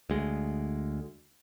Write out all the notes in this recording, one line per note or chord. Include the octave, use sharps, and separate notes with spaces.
D2 G#3